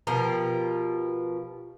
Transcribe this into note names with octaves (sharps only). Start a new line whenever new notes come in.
B2 F3 G4 A#4